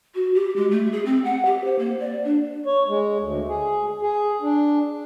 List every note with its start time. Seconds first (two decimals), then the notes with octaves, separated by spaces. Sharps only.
0.15 F#4
0.35 G4
0.56 G#3
0.71 A3
0.92 G#4
1.06 C4
1.24 F#5
1.46 G4
1.64 C5
1.79 A#3
2.00 D5
2.24 D4
2.66 C#5
2.88 G#3
3.20 D2
3.48 G#4
4.01 G#4
4.42 D4